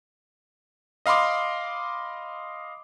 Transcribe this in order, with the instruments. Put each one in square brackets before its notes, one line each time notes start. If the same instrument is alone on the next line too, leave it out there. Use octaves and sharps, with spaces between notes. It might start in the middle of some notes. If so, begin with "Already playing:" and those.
[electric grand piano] D#5 F5 B5 C6 D6